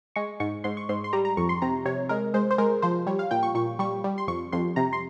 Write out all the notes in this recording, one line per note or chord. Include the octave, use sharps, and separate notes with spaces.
G#3 C#6
G#2 C#6
G#2 C6
C#6
G#2 C6
C6
G3 A#5
A#5
F2 C#6
C6
C3 A#5
C3 C#5
G#3 A#4
G#3 C5
C5
G#3 A#4
F3 C5
G3 C#5
F5
A#2 G5
C#6
A#2 C#6
G3 C#6
G3
C6
F2 C#6
F2 C6
C3 A#5
C6